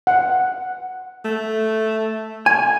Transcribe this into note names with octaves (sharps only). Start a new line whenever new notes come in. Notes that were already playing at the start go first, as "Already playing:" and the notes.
F#5
A3
G#5